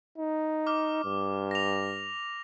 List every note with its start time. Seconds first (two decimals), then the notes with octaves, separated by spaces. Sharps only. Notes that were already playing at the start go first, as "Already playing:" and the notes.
0.18 D#4
0.67 D6 F6
1.05 G2
1.51 A#6 F7